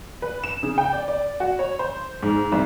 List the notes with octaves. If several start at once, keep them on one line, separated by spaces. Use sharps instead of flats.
B4
E7
C#3
G5
D5
D5
F#4
C#5
C5
G#2
C2